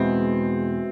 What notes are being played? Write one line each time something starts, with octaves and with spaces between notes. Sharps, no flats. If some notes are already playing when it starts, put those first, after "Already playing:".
Already playing: E2 B2 G#3 C4